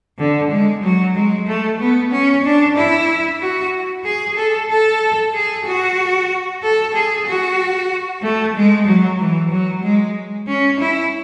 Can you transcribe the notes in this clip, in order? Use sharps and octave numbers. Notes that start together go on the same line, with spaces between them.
D3
G#3
F#3
G#3
A3
B3
C#4
D4
E4
F#4
G#4
A4
A4
G#4
F#4
A4
G#4
F#4
A3
G#3
F#3
E3
F#3
G#3
C#4
E4